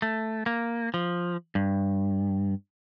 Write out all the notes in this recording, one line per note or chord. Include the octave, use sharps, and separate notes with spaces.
A3
A#3
F3
G2